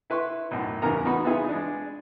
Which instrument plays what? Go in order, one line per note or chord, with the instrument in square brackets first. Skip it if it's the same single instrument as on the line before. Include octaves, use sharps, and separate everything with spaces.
[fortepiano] E4 B4 C6 C#6
B1 F#2 A2
A1 E2 C#3 B3 A#4 A#5
B3 D#4 F#4 B5
E3 B3 D#4 F4 G#4
G#3 D4